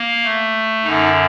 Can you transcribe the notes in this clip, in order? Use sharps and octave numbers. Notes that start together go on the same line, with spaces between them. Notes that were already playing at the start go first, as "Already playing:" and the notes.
Already playing: A#3
A3
F#2 D3 D#4